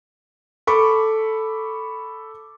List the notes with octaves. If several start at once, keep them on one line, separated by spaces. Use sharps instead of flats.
A4 B5 C#6 D6